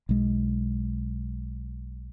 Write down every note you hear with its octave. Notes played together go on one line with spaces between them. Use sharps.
B1 G#3